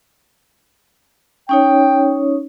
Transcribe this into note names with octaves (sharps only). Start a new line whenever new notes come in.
C#4 D#4 C#5 G5